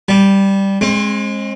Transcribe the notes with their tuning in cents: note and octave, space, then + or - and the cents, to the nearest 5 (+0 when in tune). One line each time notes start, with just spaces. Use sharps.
G3 +0 A5 -35
G#3 +0 C4 +35